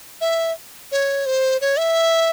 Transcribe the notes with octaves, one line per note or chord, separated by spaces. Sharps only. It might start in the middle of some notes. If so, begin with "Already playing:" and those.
E5
C#5
C5
C#5
E5